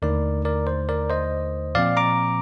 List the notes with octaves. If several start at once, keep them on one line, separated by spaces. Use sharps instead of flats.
D#2 D3 A3 D#4 A#4 D5
A#4 D5
C5
A#4 D5
C5 D#5
A#2 F3 C4 D5 F5
A#5 D6